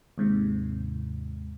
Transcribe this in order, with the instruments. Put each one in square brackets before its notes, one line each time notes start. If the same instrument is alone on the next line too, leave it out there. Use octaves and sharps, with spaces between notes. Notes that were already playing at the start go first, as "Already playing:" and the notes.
[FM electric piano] D#2 G#2 C3